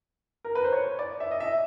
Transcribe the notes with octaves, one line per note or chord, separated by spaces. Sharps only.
A#4
B4
C5
C#5
D5
E5
D#5
E5